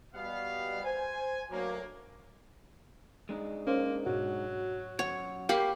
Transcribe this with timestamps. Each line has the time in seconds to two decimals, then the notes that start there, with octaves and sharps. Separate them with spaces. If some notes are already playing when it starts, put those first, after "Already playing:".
0.15 B2 G3 B3 F5
0.84 C5 G#5
1.50 D2 F#3 A#3
3.29 G#3 D4 D#4
3.67 A#3 C#4 C5
4.06 G#2 B2 F#3 F#4
4.99 F#2 C#5 F#5
5.49 A#3 G4 F5 B5 C7